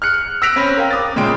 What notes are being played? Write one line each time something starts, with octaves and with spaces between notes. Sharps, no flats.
F6 F#6 C#7
E6 F#6 A#6 B6 D7 F7
C4 C#4 B5
A#4 F5 G5
D6 D#6 A6
A#2 C#3 G#3 G5 D7